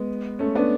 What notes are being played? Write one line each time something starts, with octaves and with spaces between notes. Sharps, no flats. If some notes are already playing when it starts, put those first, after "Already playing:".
Already playing: G#3 B3
A3 C#4
B3 D4